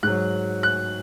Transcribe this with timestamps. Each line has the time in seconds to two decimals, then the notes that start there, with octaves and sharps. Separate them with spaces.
0.03 G#2 F#3 F#6
0.63 F#6